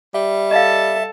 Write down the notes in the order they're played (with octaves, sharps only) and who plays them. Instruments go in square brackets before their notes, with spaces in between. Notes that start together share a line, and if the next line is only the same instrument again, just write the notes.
[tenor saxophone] G3 [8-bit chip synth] E5
[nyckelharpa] A4 A5 [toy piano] D#5 F5